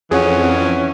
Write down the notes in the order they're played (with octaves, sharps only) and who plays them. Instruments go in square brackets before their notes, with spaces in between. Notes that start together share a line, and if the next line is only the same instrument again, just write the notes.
[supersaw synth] F2 [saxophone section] E3 C#4 [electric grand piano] G#4 C#5 F#5